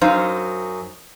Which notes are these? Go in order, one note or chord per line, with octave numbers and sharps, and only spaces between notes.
F#2 F#3 D#4 C5 F5